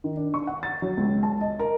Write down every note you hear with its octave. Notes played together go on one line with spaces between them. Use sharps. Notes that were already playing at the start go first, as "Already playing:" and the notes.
D#3
D4
C#6
F#5
A6
F#3
C#2
A5
D#5
A#4